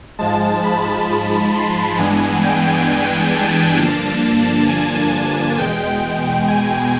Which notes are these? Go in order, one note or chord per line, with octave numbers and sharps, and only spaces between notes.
G#2 F3 G#3 A5
B5
C6
G2 E3 G#3 B3 D4 G#5
G5
A5
G2 D3 F3 A#3 D4 A5
G#5
E2 B2 G#3 G5
G#5